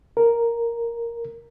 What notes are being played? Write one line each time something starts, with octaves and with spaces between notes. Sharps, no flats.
A#4